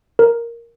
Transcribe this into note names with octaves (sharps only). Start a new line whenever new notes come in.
A#4